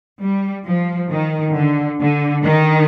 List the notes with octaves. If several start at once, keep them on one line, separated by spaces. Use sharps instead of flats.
G3
F3
D#3
D3
D3
D#3